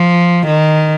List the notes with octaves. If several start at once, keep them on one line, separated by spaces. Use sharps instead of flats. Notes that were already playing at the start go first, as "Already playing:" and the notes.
Already playing: F3
D#3